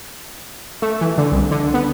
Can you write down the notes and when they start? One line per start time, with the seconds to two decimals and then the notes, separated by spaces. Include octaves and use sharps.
0.82 A3
1.01 E3
1.18 D3
1.32 C2
1.51 D3
1.74 B3